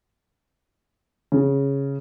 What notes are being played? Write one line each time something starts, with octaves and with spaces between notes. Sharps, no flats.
C#3